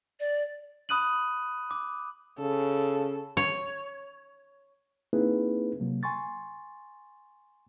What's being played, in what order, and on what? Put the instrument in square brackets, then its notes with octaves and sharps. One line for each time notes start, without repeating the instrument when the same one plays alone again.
[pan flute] D5
[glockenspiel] B5 D#6 F#6 D#7 F#7
D6
[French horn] C#3 [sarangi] A4
[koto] C#5
[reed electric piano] A#3 C4 D#4 E4 G#4 B4
C3 F#3 A#3
G#5 C6 C#6 A6